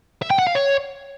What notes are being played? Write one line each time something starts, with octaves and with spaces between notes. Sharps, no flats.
E5
G5
F#5
F5
C#5